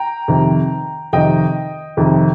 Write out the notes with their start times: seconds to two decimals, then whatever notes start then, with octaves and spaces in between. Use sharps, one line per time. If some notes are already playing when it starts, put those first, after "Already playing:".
Already playing: G5 A#5
0.28 F2 C3 D#3
1.13 F2 C3 D#3 D#5 G5
1.97 F2 C3 D#3